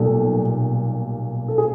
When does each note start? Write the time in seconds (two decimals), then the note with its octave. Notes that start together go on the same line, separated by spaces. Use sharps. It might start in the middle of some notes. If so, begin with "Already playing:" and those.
Already playing: B1 A#2 G3 A4
1.48 A4
1.58 G#4